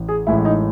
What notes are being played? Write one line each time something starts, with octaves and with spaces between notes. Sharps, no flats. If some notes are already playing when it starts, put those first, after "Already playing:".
Already playing: A1
G#4
A1 A2 G#3 E4
D#4